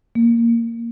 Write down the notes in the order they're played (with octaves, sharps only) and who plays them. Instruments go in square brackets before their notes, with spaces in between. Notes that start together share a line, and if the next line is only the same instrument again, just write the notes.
[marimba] A#3